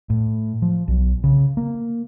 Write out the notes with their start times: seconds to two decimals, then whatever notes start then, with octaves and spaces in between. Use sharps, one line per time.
0.10 A2
0.62 F3
0.88 B1
1.24 C#3
1.57 A#3